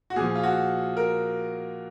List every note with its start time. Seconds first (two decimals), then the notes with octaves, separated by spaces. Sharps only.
0.10 F#4
0.16 A#2 F3 G#4
0.35 F4
0.43 F#4
0.97 A#4